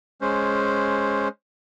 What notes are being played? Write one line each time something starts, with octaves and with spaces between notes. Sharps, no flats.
G#3 C#4 C5